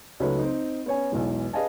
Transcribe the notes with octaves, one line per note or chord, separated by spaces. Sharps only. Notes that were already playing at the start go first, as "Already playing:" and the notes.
C#2 F#3 A3 D#4 B4 C#5
C4 D#4
B3 C#4 C#5 G#5
B1 E2 E3 G#3
G#4 B4 D#5 F5 G#5 A5